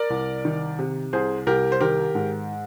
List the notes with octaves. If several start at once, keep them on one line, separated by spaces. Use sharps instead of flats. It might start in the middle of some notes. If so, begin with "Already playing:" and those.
Already playing: A#4 D5
C2
D#3
C3
C2 G#4 C5
C2 G4 A#4
C5
D#3 G4 A#4
G#2